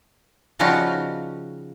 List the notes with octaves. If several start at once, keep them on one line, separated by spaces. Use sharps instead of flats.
C#3 F3 G3 D#4 F4 F#4